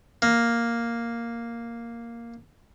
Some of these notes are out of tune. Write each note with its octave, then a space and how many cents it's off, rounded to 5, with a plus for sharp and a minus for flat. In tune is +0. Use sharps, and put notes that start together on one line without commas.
A#3 +0